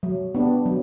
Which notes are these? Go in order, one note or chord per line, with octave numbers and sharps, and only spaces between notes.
F#3
B3 D4 G4
F#3